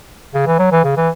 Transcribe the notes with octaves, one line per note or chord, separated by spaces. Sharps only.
C#3
E3
F#3
E3
C#3
E3